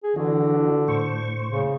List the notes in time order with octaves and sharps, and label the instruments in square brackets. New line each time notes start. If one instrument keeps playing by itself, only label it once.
[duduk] G#4
[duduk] D3 [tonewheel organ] E3 D4 F#4
[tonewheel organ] A2 C5 C#6
[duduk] C#3